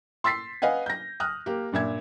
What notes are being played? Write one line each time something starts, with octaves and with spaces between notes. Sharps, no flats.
C6 E6 A6 B6 C7
B4 D#5 F5 F#5 G#5
G6 A#6
D#6 F6 F#6
A#3 G4
G2 A#2 E5 G#6